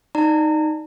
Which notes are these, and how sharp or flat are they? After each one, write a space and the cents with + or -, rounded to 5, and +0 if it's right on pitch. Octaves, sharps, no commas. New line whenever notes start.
D#4 +0 D5 +15 A#5 -30